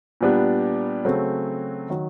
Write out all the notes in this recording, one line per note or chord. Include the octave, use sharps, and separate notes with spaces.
A#2 G3 B3 D4 G4
C#3 F#3 A3 C4
D#3 F#3